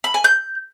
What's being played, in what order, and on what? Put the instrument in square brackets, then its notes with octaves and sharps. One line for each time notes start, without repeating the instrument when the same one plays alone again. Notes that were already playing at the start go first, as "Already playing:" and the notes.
[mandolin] B5
G#5
G6